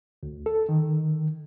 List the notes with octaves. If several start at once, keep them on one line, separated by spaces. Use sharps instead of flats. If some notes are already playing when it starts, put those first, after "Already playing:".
D2
A4
D#3